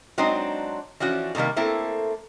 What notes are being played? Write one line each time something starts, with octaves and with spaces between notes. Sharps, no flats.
F#3 G#3 C4 D4 D#4 C5
E3 F3 C#4 D4 F#4
A2 C3 D#3 G3 A#3
A3 A#3 C4 E4 A4